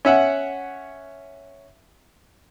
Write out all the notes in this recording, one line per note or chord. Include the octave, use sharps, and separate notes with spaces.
C#4 E5 F#5